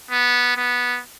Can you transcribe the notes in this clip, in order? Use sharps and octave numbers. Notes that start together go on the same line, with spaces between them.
B3
B3